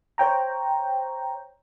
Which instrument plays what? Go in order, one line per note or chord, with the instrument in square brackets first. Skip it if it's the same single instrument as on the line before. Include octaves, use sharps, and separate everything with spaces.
[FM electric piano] C5 C#5 G5 A#5